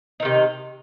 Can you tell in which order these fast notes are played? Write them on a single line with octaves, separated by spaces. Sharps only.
D#4 D#3 C3